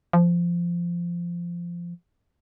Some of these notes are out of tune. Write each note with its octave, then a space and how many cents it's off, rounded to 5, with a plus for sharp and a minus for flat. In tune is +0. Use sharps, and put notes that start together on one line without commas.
F3 -15